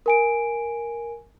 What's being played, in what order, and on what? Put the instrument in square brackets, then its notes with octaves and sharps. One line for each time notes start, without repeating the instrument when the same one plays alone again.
[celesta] A#4 G#5 D7